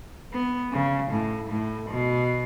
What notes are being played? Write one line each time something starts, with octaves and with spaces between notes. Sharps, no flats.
B3
C#3
A2
A2
B2